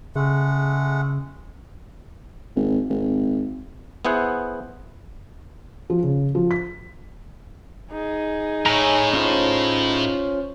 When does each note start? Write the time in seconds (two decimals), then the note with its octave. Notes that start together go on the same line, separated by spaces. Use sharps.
0.16 C#3 G#3 A3 F#5
2.56 G#1
2.90 G#1
4.05 B3 E4 G#4 C5 F#5
5.90 F3
6.03 C#3
6.35 F3
6.51 B6
7.92 D#4 G#4
8.66 A2 C#5 G#5 A#5
9.13 C#4 F4 C5